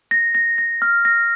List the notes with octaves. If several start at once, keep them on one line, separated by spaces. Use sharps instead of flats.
A#6
A#6
A#6
F6
A#6